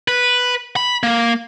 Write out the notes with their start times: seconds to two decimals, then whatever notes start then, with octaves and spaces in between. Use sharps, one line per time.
0.08 B4
0.76 B5
1.03 A#3